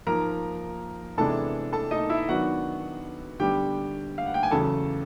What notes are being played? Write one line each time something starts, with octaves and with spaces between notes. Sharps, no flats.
G#2 F3 A#3 A#4 A#5
C3 E3 G#3 B3 D4 A4 A5
A4 A5
D#4 D#5
E4 E5
D#3 F#3 B3 D4 F#4 F#5
D3 G3 B3 G4 G5
F5
F#5
G5
G#5
E2 C#3 F#3 A4 A5